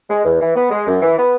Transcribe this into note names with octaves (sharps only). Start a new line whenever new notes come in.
G#3
E2
E3
B3
G#3
F#2
E3
B3